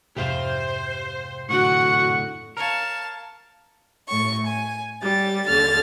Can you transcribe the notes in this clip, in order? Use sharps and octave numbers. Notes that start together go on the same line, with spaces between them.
F2 G#2 C3 G4 C5 E5 F5
A2 D3 F#4 F#5 C#6
A#4 C#5 F5 A5
A2 C#6
G#5
G3 A6
D#2 D3 F6 A6